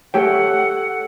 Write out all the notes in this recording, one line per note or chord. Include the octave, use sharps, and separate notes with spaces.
A3 G4 A4 C#5 F#5 G5